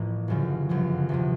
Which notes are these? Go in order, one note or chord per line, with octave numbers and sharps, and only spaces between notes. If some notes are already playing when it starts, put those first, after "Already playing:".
Already playing: A1 A2 F3 A#3
G1 F#2 C#3 F3
G1 F#2 C#3 F3
E2 C3 F3